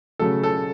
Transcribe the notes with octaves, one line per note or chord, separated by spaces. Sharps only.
C#3 F#3 A3 A4
A4